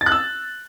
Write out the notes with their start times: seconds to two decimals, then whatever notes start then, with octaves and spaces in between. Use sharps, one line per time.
0.01 A6
0.06 F#6
0.12 E6